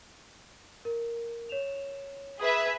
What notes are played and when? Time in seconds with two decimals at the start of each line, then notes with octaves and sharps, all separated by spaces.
0.85 A#4
1.49 C#5 E7 F7
2.39 G#4 B4 E5 D#6